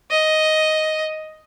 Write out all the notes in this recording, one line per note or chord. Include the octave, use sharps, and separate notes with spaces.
D#5